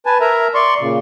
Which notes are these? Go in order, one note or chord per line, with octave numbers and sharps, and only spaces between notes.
B4 G#5 A5
A#4 E5 A#5
D5 C6 C#6
A#2 C#3